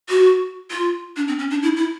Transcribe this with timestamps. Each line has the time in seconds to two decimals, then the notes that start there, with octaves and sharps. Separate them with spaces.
0.09 F#4
0.71 F4
1.16 D4
1.28 C4
1.39 C#4
1.50 D4
1.62 E4
1.77 E4